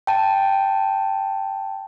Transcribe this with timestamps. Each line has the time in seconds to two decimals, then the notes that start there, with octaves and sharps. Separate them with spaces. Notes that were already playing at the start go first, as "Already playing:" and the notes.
0.07 G5 A5